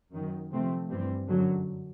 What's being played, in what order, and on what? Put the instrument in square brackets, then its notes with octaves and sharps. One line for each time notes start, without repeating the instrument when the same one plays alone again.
[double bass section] F#2 D#3 F#3
C3 F3 A3 C4
G2 E3 G3 C4
F#2 D3 F#3